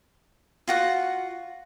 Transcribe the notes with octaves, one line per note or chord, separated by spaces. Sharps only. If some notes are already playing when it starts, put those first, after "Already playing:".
F4 F#4 F#5